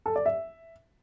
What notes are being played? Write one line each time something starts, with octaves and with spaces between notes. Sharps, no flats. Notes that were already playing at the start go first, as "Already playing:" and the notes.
A4
D5
E5